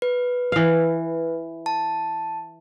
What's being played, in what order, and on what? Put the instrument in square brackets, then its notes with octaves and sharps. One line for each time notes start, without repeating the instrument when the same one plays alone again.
[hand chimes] B4
[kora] E3 F5
[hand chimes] A5